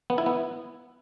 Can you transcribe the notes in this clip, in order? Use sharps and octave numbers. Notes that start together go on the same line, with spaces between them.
B3
E4
B3